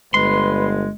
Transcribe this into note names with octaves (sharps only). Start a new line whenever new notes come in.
G1 G#3 B4 C6